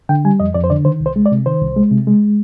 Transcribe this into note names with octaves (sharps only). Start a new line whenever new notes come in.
D3 G5
G3 G#5
F2 D#5
F2 D5
C5
D3 D5
D#3 C5
C2
C5
G#3
D5
C3
D#3 C5
C2
G#3
C3
G#3